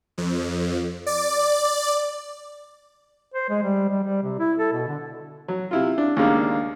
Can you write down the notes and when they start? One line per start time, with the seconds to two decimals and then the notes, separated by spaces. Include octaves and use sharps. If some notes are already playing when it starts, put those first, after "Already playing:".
0.18 F2
1.06 D5
3.34 C5
3.49 G#3
3.63 G3
3.89 G3
4.03 G3
4.23 C3
4.39 E4
4.58 A4
4.72 B2
4.88 D3
5.48 F#3
5.71 C3 E4 F4
5.98 D4
6.17 D#2 C#3 G#3 A#3 D4